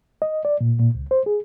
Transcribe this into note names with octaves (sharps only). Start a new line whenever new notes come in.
D#5
D5
A#2
A#2
C#2
C5
G#4